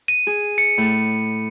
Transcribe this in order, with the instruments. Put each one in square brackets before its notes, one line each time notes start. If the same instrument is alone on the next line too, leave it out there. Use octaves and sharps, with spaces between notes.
[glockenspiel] D#7
[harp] G#4
[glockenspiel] C#7
[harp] A2